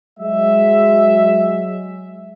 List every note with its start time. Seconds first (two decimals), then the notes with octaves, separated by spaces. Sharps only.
0.20 F#3 G#3 E5